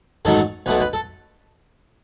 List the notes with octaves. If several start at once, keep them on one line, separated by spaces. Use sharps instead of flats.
A1 G#2 D#3 F#3 A3 A4
B1 B2 A3 B4
B4
A4